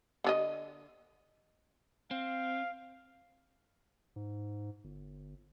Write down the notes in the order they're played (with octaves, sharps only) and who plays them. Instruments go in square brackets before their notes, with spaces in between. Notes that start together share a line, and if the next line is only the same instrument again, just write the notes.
[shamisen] D3 C#4 D#5
[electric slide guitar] C4 [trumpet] F5
[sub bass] G#2
G1